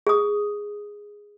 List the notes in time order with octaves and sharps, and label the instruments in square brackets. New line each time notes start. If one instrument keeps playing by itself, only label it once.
[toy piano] G#4 D#6